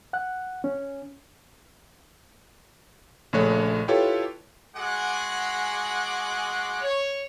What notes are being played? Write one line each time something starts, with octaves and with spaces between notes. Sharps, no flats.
F#5 F#6
C#4
A#1 C#3 A3 C#5 F#6
E4 F4 G4 A4 B4 C#5
G#3 F#4 G#4 F#5 D6
C#5